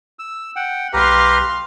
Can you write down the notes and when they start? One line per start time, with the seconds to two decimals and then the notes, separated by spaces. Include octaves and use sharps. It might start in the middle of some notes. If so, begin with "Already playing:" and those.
0.19 E6
0.56 F#5 G5
0.93 B1 G4 B4 F5 A#5 C6